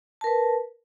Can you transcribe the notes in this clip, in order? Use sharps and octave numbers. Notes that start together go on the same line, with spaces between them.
A#4 B4 A5